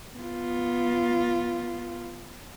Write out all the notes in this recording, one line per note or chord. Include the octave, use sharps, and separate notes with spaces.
B3 F4